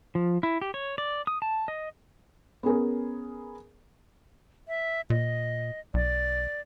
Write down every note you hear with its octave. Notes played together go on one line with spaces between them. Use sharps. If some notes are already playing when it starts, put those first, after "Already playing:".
F3
E4
G4
C#5
D5
D#6
A5
D#5
B3 C#4 G#4 A#4
E5
A#2 D#5
B1 D5